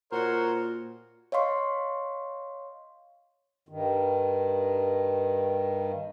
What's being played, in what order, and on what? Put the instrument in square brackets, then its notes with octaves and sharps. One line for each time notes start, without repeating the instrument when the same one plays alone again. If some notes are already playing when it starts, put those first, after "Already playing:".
[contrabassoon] A#2 [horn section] F#4 C5 C#5 [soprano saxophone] A#4
[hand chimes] C#5 D#5 F5 C6 C#6
[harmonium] G2 D#3